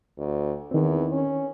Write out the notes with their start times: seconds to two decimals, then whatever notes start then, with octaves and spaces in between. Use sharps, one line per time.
0.17 D2
0.71 E2 D#3 C4
1.12 C#4